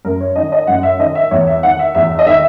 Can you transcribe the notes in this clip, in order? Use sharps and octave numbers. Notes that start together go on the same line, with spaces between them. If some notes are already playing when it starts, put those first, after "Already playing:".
F#2 A#4
C#5
D#3 D#5
D#5
F#2 F#5
E5
D#3 D#5
E5
E2 C#5
E5
D#3 F#5
E5
E2 E5
E5
D#5
D#3 E5